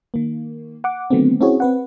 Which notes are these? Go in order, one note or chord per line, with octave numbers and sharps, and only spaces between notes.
D#3 A#3
F#5 D6
D3 D#3 F#3 A3 B3 C4
C4 C#4 E4 F#4 G#4 C#5
C4 B4 F#5